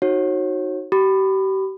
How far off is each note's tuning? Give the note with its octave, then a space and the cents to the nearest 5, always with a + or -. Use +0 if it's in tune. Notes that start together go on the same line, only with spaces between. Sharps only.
D#4 +0 F#4 +0 C#5 -35
G4 -35 B5 +15 D6 +45